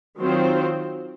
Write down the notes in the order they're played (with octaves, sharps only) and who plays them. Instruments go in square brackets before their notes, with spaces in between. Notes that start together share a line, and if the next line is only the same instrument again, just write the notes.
[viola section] D#3 F#3 C4 F4 C5